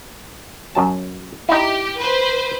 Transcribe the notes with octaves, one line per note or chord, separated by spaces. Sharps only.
F#2 F#3 A5
D#4 E4 G4
B4 C5